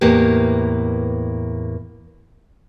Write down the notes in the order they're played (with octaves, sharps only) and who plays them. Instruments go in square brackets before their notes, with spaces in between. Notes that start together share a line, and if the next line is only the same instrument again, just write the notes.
[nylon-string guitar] E2 A2 A#3 G4 B4